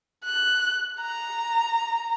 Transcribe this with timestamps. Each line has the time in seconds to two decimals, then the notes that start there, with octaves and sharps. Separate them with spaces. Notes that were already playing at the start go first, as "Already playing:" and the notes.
0.25 F#6
1.01 A#5